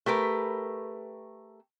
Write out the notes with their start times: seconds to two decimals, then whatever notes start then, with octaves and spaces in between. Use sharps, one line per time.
0.06 A3 G4 A#4 B4